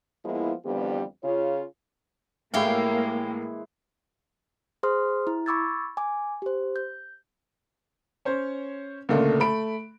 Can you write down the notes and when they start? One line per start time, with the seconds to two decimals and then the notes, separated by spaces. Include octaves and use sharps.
0.25 F3 G#3 A#3 B3 E4
0.66 F2 D3 E3 G3 B3 G4
1.24 C#3 F4 C#5
2.54 A2 E3 G#3 A#3 E4 G4 C#5 F5
4.83 G#4 C5 C6 D#6 F6
5.27 E4
5.46 B5 C#6 D6 E6 G#6 A6
5.97 G#5 D6
6.42 G4 C5
6.76 G6
8.25 C#4 C5 C#5
9.09 C#2 A#2 D3 A3 A#3
9.40 A3 B5 D7